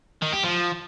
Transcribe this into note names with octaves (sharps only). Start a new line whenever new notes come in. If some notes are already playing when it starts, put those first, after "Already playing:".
D#3
G4
F3